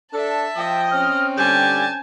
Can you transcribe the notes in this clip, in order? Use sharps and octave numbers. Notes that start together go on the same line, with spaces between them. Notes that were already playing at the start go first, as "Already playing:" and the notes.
D4 A4 E5 A5
F3 D#5 G5
C4 C#4 F6
D3 G3 G4 G#5 A5 G6